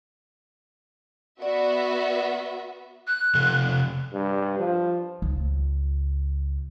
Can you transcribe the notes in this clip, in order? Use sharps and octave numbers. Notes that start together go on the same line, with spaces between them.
B3 F#4 D5 E5
F#6
C3 F3 A4
G2
F3
C#2